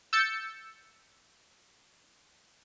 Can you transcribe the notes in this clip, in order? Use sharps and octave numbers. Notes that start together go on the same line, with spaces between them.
E6 G6 A6 C#7